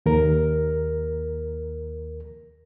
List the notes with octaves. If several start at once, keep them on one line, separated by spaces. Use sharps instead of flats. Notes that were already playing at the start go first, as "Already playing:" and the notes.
D#2 A#4